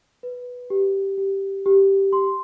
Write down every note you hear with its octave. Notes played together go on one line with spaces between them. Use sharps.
B4
G4
G4
G4
C6